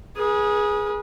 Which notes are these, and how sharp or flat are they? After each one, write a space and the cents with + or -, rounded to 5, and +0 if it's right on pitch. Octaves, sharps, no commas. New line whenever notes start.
G#4 +0 B4 -40